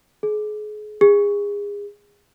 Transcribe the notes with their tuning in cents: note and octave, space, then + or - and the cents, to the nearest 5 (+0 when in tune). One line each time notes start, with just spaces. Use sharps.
G#4 +35
G#4 -30